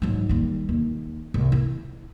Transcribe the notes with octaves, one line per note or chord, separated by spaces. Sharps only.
G#2 F#3
D#2 G3
D#2
C2
E4